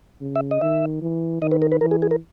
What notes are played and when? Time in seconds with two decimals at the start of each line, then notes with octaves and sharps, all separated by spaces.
0.21 C#3
0.36 E5
0.51 D#5
0.61 D#3 E5
1.02 E3
1.42 D#3 D#5
1.52 B4
1.62 A#4
1.72 B4
1.81 E3 A#4
1.91 G#4
2.02 G#4
2.11 A#4